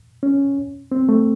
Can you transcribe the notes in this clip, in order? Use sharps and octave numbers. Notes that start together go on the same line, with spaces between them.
C#4
C4
A3